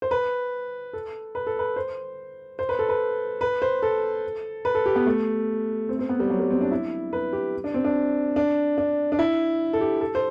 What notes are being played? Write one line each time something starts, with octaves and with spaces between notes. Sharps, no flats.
C5
B4
A4
B4
A4
B4
C5
C5
B4
A4
B4
B4
C5
A4
B4
A4
G4
B3
A3
C4
C4
B3
G3
F#3
G3
C4
D4
E4
B4
G4
D4
C4
D4
D4
D4
D4
E4
A4
G4
A4
C5